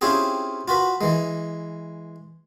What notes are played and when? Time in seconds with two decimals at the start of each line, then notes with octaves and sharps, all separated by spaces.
0.01 C4 C#4 E4 F4 G4 G#4
0.68 F4 F#4 B4
1.01 E3 G#3